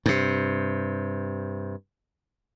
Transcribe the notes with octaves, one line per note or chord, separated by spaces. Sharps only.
G2 C3